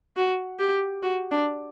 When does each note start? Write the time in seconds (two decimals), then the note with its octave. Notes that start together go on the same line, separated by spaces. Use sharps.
0.17 F#4
0.59 G4
1.03 F#4
1.31 D4